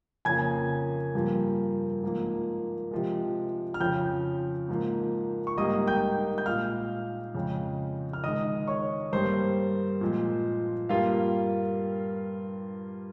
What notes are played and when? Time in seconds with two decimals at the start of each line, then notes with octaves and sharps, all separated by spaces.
0.25 F2 C#3 F3 A#3 G#5 G#6
1.15 G2 F3 A#3
2.03 G#2 F3 A#3
2.91 C3 F3 G#3
3.74 F6
3.80 F2 C#3 F3 G5 G6
4.68 G#2 F3 A#3
5.47 C#6
5.57 G#2 G3 A#3 D#5 D#6
5.87 G5 G6
6.38 G6
6.46 A#2 G#3 F5 F6
7.35 F2 C#3 G#3
8.13 F6
8.24 G#2 D#3 G#3 D#5 D#6
8.68 C#5 C#6
9.13 G2 G3 A#3 C5 C6
10.01 A#2 F3 G#3
10.89 G2 G3 A#3 F4 F5